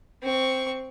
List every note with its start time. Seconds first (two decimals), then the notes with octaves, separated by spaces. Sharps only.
0.22 C4 C#6